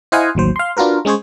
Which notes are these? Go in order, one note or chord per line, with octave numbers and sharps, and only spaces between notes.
E4 C5 D#5 F5 F#5 G#5
A1 D#2 F#3 C5
F5 C6
D4 F4 F#4 A#4 B4
G#3 C#4 G#4 C5 C#5